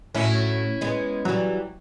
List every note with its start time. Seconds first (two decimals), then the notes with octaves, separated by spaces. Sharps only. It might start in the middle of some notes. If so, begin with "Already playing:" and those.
0.14 A2 F#3 C#4 E4
0.81 G#3 B3
1.25 E3 F#3 G3